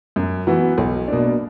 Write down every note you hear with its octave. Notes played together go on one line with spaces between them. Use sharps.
F#2
E3 B3 F#4
B1
B2 A#3 D4